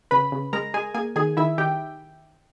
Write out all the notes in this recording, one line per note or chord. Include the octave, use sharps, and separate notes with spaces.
C#3 B4 B5
C#3
G#3 A#4 A#5
G#3 G#4 G#5
A#3 G#4 G#5
D#3 G#4 G#5
D#3 E4 E5
D#3 G4 G5